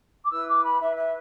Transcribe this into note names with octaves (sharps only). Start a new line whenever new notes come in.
D6
E4 B4 E6
D6
B5
E4 B4 E5
E5